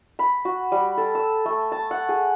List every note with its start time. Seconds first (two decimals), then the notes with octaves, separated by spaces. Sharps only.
0.19 B5
0.45 F#4
0.72 G3
0.97 A4
1.15 E6
1.46 A3
1.72 A5
1.91 F#5
2.09 G#4